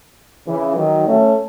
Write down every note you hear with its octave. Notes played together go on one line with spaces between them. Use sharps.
C#3 E3
D#3 F#3
A3 C#4